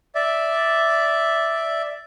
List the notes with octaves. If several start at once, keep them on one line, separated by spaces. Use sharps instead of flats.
D5 E5